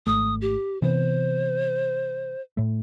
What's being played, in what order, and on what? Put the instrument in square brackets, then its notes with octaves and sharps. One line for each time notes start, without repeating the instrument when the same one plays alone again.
[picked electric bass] G#1 A3 [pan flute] D#6
[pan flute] G4
[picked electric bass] C3 E3 B3 [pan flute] C5
[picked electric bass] A2 A3